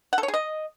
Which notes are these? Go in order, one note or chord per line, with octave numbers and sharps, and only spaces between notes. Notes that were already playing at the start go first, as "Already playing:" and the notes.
F#5
A4
C#5
G#4
D#5